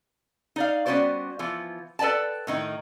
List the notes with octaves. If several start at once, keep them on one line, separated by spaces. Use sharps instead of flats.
D#4 D5 F5
G3 B3 C#4 F#4 C5 D5
E3 F3 B3
A4 B4 D5 G5 A5
A2 D#3 D#4